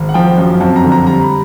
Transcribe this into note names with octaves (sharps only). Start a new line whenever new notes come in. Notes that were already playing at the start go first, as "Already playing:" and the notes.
Already playing: G#1
F#5
F3 G5
F#2
F2 A5
A#5
D3
A#5
G3 A#5
B5